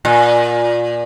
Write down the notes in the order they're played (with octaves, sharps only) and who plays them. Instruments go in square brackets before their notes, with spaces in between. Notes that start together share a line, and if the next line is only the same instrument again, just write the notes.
[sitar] A#2